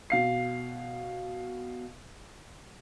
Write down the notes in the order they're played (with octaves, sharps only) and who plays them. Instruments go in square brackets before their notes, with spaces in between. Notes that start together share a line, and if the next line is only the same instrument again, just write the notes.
[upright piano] B2 F5 C7